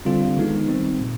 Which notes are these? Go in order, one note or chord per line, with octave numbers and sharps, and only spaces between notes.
D3 G3 C4 F4 A4
D#3 G#3 B3 D#4
D#3 G3 C4
A#2